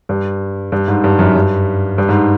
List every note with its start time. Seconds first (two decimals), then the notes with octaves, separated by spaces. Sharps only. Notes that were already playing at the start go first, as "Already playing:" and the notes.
0.09 G2
0.72 G2
0.88 G#2
1.04 G2
1.19 F#2
1.36 G2
1.98 G2
2.09 G#2